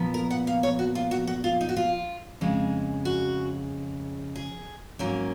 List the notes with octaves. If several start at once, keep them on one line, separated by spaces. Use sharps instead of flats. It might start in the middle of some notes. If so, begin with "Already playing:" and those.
Already playing: A#2 F3 B3
A#4
F#5
F5
C#5
F#4
F4
F#4
F#4
F4
D#4
F#4
F4
F2 C#3 G#3
F#4
G#4
G#2 F#3 A#3 C#4